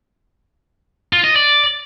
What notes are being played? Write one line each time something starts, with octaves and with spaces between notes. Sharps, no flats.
F4
D#5
D5